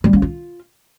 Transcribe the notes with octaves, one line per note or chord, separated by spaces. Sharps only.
G3
C#4
F4